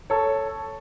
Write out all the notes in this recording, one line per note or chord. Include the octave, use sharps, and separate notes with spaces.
A4 C#5